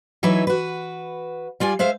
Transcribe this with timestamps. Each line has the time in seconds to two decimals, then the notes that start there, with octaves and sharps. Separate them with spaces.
0.23 E3 F#3 D#4 E4 B4
0.47 F#4 B4
1.60 G3 F4 D5 G#5
1.79 G#3 C5 E5 F5